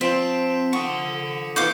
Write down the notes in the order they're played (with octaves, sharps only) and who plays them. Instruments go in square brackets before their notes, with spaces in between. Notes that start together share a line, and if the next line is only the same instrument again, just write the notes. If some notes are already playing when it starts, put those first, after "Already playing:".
[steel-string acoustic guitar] F3 A5 [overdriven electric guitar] C4 [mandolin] C5 [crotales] B6 D7 E7
[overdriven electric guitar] A4 F#5 [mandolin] C#6 [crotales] D#6 C#7
[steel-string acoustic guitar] E3 B3 D#4 [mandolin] F5 D6 G6 [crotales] C#6 C#7